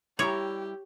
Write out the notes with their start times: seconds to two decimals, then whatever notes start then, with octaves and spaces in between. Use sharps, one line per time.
0.19 G3 E4 G4 C#5 A#5